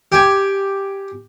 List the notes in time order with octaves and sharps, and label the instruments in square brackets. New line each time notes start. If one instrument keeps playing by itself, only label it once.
[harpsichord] G4 G5 G#5